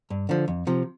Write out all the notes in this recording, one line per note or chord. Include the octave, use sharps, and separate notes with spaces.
G2
D3 F3
F2
C3 F3